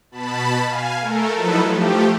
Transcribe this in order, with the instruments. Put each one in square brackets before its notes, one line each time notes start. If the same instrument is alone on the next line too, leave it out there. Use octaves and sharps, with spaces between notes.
[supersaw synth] B2 A5 B5
F5 G#5
A3 A4 A#4
F3 F#3 D#4 E4 A4 B4
F3 A3 G4